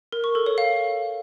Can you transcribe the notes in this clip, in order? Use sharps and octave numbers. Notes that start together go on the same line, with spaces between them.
A#4
C#6
A4
C#5
F5